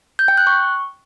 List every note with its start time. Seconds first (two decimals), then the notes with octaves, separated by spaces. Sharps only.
0.19 G6
0.28 G5
0.38 F#6
0.47 C#6